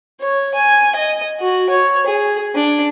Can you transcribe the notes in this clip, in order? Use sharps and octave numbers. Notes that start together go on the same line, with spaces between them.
C#5
G#5
D#5
F#4
C#5
G#4
D4